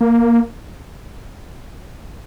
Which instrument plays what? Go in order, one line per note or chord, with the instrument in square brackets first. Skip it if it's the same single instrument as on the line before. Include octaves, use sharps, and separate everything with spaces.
[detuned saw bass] A#3